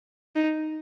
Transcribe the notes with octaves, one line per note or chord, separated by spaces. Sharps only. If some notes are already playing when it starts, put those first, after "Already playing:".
D#4